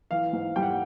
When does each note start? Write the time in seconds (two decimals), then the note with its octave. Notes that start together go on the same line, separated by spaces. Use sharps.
0.11 E3 F5
0.33 G#2
0.56 G3 G5
0.63 F#5